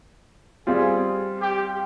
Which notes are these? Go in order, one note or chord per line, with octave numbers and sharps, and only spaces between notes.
G3 C4 F4 G#4
G4